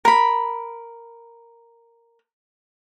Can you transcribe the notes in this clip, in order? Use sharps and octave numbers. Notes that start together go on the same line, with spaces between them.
A#4 B5